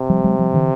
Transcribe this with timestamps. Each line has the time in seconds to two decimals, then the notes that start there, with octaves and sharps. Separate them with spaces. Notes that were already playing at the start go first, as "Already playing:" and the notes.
Already playing: C3
0.09 F3 G3
0.24 F#3 G#3
0.39 F3 G3
0.54 D3 E3